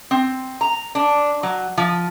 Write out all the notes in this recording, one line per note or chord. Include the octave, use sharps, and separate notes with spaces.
C4
A#5
D4
F#3
F3